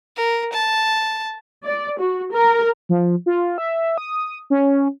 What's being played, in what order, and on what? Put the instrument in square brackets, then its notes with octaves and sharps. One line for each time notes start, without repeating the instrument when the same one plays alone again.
[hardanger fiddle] A#4
A5
[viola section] D5
F#4
A#4
[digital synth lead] F3
F4
E5
D#6
C#4